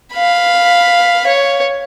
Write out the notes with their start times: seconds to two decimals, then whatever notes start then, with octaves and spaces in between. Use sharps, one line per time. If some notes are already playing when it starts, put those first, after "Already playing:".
0.14 F5 B5
1.27 C#5